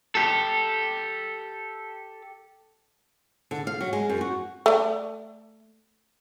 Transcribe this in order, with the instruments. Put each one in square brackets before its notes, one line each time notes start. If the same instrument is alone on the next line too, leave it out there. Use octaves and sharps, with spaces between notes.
[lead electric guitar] G4 A4
[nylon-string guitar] D3
F5
F#3
G#3
F#2
F#4
[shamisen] A3 D5